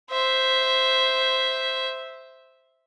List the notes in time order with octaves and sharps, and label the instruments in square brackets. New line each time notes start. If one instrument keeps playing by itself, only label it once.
[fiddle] C5 E5